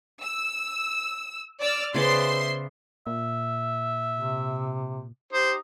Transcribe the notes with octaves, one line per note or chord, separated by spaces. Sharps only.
E6
D5 E6 F6
C#3 B3 C5 D5 E5 C6
A#2 E5
C3
D#4 G4 C5